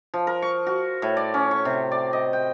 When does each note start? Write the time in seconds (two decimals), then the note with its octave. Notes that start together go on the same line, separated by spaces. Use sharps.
0.14 F3
0.27 A#4
0.42 C#6
0.67 F#4
1.02 A2
1.17 D5
1.34 C#4
1.51 C#6
1.65 C3
1.92 D5
2.13 D#5
2.33 G5